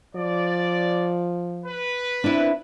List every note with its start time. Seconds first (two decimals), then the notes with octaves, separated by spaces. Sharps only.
0.16 F3 D5
1.66 B4
2.24 C4 D4 E4